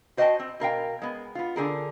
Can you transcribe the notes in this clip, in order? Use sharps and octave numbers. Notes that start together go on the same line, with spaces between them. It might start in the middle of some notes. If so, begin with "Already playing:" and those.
F#4 C5 D#5 F#5 G5 A5
C4
B2 A#4 F5 G5
G#3 B3
B3 F4
D3 G#4 A#4